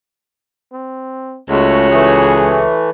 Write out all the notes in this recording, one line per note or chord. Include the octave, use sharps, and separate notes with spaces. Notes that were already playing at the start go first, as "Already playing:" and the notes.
C4
C#2 G#3 A3 F#4 C#5
E3 A3 G#4